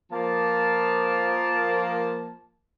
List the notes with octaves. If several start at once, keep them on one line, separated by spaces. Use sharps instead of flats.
F3 A#3 A5